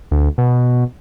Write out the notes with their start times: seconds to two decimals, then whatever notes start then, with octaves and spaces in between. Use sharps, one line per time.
0.11 D2
0.38 B2